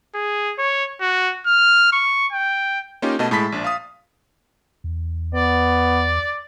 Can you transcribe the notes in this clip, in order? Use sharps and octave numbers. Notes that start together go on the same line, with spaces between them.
G#4
C#5
F#4
F6
C#6
G5
A#3 C#4 D#4 F4 G4
B2 A3 D#5 A5
A2 G#3 A5 B5 A6 B6
A#1 D4
F5 D#6
E2
B3 D5